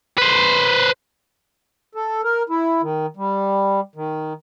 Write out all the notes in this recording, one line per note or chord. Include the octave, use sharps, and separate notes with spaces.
B4 C5
A4
A#4
E4
D#3
G3
D#3